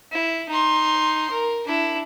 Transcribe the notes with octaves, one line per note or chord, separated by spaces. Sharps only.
E4
D#4 C6
A#4
D4 E4